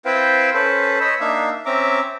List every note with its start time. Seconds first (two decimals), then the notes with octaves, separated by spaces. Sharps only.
0.05 C4 E4 B4 C5 F5 G5
0.54 C#4 A4 B4 C5
1.01 C#5 D#5 B5 E6
1.20 A#3 D4 D#4 E5 F5
1.66 C4 C#4 E5 A#5 D6